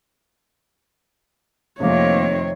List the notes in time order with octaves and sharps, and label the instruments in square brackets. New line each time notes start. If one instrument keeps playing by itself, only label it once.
[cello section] F2 D#3 C4 [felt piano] C3 F3 A3 [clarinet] A#3 [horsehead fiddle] C#5